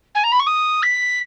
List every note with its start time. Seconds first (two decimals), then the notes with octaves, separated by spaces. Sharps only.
0.15 G#5
0.24 A#5
0.32 B5
0.39 C#6
0.47 D#6
0.83 B6